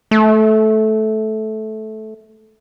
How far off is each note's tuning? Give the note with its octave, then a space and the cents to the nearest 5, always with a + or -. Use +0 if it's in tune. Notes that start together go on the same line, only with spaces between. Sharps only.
A3 -15